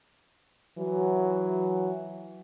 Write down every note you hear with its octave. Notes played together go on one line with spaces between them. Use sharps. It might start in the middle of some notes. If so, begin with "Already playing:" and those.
E3 F#3